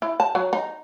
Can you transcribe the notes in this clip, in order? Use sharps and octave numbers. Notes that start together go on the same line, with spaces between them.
E4
A5
F#3
D#4